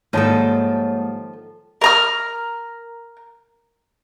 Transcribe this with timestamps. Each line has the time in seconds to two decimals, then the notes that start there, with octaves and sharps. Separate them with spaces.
0.13 G#2 D#3 F3 G3 A#3 A4 C#5 A5
1.81 A#4 A#5 F6